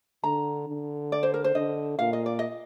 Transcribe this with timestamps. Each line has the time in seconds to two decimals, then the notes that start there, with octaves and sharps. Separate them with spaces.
0.24 D3 A#5
0.68 D3
1.12 D5
1.23 C5
1.34 A#4
1.44 C5
1.55 D3 D#5
1.99 A#2 F5
2.13 D#5
2.26 D5
2.39 D#5